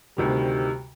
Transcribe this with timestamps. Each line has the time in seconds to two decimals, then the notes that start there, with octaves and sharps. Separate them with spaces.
0.17 D2 C3 D#3 G3